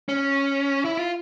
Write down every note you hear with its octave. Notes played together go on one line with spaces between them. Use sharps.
C#4
E4
F4